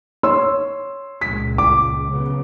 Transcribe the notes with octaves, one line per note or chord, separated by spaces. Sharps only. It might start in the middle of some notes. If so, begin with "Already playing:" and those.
C#5 C6 E6
C#2 A#2 B6
D6
C#3 F#3 B3